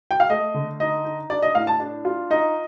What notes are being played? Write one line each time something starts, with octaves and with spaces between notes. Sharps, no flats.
G5
F5
A3 D#5
D3
D#4 D#5
D#4
D4 D5
D#5
A2 F5
A5
D4
F4
D#4 D#5